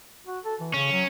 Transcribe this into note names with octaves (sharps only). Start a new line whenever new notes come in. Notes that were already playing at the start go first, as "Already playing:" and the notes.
F#4
A4
E3
C#3 C#4
F#3